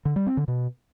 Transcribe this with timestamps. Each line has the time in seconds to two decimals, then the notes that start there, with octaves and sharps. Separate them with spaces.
0.05 D3
0.16 G3
0.27 C4
0.37 D3
0.48 B2